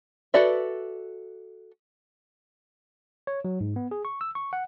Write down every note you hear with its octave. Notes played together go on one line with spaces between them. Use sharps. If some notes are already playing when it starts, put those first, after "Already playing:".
F#4 A4 B4 D5 E5
C#5
F#3
G#2
B3
G#4
C#6
E6
C#6
F#5